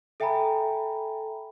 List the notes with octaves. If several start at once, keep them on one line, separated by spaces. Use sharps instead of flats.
A4 E5 G5 G#5 A#5 B5